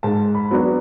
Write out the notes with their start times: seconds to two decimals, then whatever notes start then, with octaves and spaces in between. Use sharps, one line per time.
0.03 G#2 A5
0.35 B5
0.51 F#3 B3 D4